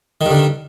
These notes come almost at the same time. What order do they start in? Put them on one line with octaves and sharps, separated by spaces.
D#3 G2 D3